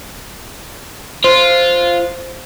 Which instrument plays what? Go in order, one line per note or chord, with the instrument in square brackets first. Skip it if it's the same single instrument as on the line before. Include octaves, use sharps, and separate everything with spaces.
[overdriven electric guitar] F4 [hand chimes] C5